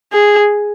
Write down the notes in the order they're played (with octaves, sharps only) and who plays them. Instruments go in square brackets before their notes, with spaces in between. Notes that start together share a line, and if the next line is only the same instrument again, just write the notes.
[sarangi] G#4